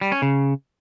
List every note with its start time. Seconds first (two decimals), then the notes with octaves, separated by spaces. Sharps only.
0.01 G3
0.12 C#4
0.22 C#3